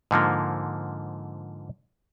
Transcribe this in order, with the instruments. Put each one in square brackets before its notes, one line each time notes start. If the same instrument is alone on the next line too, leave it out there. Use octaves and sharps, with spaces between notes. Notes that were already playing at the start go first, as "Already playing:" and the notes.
[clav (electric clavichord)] G#2 D3 F3 A#3